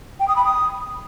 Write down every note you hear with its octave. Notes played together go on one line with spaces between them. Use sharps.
G5
D#6
B5
D#6